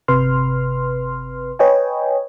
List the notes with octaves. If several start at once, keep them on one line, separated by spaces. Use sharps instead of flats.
G1 C3 B4 C6 F6
B4 C#5 D#5 G5 G#5